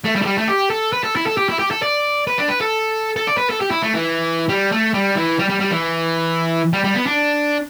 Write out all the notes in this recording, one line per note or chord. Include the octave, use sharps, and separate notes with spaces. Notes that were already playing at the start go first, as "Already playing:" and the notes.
A3
G3
A3
G3
A3
G4
A4
B4
A4
E4
A4
G4
E4
G4
A4
D5
B4
D4
B4
A4
A4
D5
B4
A4
G4
E4
A3
E3
G3
A3
G3
E3
G3
G3
G3
E3
G3
G3
B3
D4